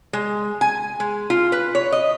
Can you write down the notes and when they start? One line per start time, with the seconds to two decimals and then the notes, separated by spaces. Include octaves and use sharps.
0.13 G#3
0.61 G#5
1.00 G#3
1.30 F4
1.52 B4
1.75 C#5
1.92 D#5